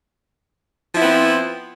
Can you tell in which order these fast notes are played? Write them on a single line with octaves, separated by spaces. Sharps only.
F3 E4 B3 C4